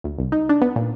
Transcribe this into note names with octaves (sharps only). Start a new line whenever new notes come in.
D2
C2
D#4
D4
B3
A#2